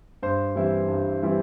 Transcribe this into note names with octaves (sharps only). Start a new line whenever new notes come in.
G2 C5
E3 G3 C4 E4
G2
E3 G3 C4 E4